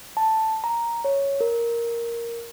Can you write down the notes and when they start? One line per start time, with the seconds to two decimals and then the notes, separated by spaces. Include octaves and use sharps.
0.17 A5
0.64 A#5
1.04 C#5
1.41 A#4